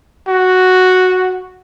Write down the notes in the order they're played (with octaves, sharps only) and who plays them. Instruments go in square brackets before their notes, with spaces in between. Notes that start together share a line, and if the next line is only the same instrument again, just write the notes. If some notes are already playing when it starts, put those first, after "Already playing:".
[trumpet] F#4